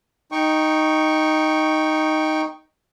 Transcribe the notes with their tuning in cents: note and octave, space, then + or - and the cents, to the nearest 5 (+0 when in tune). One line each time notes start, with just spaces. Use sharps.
D#4 +0 G5 +0 C#6 -5